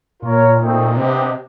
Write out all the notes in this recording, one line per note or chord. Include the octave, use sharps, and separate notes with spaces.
A#2 F4 A#4 C#5
A3 C4 D#4
C3 B3 D4 G4 C5 D#5